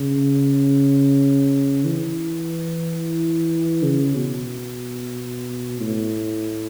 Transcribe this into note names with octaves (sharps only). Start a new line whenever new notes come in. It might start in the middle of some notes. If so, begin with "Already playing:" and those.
Already playing: C#3
E3
C#3
B2
A2